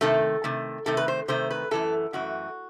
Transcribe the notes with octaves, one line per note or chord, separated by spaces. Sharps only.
C3 D#3 A3 A4
C3 D#3 A3
C3 D#3 A3 A4
B4
C5
C3 D#3 A3 C5
B4
F#2 E3 A3 A4
F#2 E3 A3 F#4